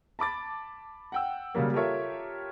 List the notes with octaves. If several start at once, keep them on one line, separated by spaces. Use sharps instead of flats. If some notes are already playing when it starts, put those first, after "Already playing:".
A5 B5 D6 A6
F#5 G5 E6
C#3 F#3 G3 A#3
F4 G4 A4 A#4 C#5 E5